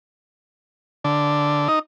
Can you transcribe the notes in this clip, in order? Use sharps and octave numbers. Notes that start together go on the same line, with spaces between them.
D3
D#4